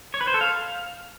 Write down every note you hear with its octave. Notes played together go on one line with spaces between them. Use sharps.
C#5
B4
C5
A4
F5